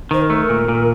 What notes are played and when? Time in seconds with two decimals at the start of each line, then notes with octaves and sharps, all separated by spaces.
0.11 D#3 C5
0.21 A#4
0.30 A3
0.49 A#2
0.68 A#2